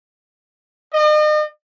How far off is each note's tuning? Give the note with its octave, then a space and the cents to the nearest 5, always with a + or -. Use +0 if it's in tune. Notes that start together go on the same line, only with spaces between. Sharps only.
D#5 -40